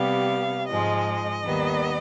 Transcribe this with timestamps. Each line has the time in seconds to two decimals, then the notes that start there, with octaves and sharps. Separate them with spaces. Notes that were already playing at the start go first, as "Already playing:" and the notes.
Already playing: C3 G3 B3 F5
0.69 G#2 F3 G#3 D#5
1.44 D#2 D#3 G3 B3